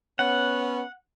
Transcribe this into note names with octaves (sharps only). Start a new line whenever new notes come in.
B3 C#4 F#5